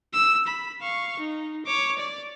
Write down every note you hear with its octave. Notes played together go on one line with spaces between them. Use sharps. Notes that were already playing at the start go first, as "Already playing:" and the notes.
E6
B5
F5 C#6
D#4
C#5 D6
D5